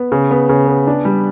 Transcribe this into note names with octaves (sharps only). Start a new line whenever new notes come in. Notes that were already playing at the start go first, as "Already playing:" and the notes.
Already playing: B3
C#3
B3
C#3
B3
D4
G3